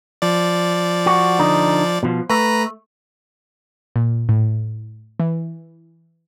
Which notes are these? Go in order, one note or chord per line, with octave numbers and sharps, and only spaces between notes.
F3 D5
F#4
D3 D#4
B2 F3
A3 B4 A#5
A#2
A2
E3